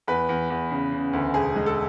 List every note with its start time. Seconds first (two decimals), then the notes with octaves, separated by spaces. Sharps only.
0.08 E2 B4
0.29 E2
0.50 E2
0.71 C#3
0.92 C#3
1.13 D2
1.34 E1 G#4
1.56 G#3
1.66 A4